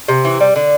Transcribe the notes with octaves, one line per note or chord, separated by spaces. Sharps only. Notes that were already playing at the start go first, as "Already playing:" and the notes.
C3
E3
G3
D3